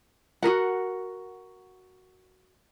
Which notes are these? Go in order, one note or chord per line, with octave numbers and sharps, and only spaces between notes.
F#4 G#4 A#4 F#5